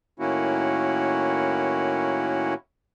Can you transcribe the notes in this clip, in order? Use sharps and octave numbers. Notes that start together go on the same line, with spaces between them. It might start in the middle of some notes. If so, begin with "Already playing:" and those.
A2 D#3 A#3 C#4 E4 F#4